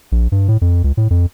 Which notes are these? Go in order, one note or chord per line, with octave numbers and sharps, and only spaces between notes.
A#1
G2
A2
F2
C#2
A2
F2